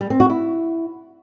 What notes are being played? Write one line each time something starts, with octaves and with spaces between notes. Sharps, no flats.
G3
C4
F#4
E4